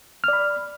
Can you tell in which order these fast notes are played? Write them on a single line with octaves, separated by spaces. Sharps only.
F6 D5 B5